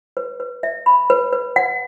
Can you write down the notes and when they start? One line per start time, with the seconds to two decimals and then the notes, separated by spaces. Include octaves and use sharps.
0.17 B4
0.40 B4
0.63 E5
0.86 B5
1.10 B4
1.33 B4
1.56 F#5